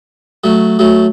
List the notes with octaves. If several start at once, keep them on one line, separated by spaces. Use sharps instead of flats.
F#3 A3
F#3 A3